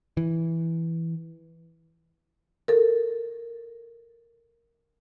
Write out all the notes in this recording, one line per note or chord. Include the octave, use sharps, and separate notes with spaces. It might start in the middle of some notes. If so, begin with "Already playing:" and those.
E3
A4 A#4